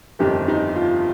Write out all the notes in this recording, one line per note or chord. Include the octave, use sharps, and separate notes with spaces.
G1 F2 D#3 G3 G4
D#4
F4